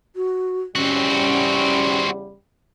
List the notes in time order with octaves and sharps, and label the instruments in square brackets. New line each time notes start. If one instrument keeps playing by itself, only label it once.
[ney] F#4
[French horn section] E2 C#3 G3 [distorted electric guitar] C4 F#4 [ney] C#4